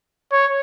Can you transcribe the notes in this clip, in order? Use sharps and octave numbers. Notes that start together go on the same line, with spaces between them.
C#5